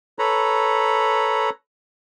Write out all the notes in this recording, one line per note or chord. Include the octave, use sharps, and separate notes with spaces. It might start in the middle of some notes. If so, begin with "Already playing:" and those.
A4 B4 C#5 A#5 B5